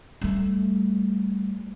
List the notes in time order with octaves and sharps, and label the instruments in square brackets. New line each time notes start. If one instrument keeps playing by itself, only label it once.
[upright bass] G3 A3